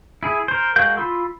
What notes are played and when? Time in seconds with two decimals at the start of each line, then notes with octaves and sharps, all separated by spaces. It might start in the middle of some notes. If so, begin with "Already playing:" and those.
0.23 E4 G#4
0.48 A#4 C5
0.76 G#3 F#4 A#4 F5 G6
0.97 F4 B5 C6 E6